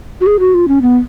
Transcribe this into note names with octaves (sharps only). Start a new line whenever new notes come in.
F#4
G#4
F#4
F4
C#4
B3